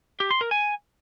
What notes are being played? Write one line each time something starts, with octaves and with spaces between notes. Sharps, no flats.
G4
C6
A#4
G#5